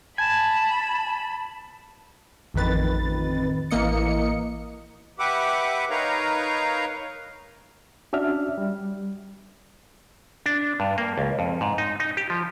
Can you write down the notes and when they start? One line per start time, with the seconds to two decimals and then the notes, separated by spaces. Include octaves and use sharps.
0.18 G#5 A5 B5
2.54 A1 F2 D#3 B4 A6
3.71 A1 E3 A#3 D#5 C#7
5.19 G4 B4 E5 F#5 D6
5.90 D#4 A#4 B4 C#5 F5 A#5
8.13 C#4 D4 F#4 E5 F6
8.58 G3
10.46 D4
10.80 G2
10.98 A#3
11.18 C#2
11.39 F2
11.61 G#2
11.78 D#4
12.00 D#4
12.17 G4
12.30 F3